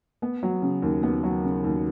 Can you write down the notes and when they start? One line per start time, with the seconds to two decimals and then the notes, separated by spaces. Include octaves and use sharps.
0.22 B3
0.43 F#3
0.62 C#3
0.82 D#2
1.03 B3
1.24 F#3
1.43 C#3
1.64 D#2